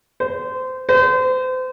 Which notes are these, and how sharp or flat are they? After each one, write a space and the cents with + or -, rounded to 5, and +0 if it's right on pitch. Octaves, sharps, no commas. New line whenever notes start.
C5 -25
C5 -35